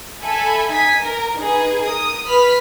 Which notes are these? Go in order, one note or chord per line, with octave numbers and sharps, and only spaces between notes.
A4 E5 G#5 B5
D#4 G#5 B6
A#4
D#4 G#4 B4
A#4 D#6
B4 B5 F6 B6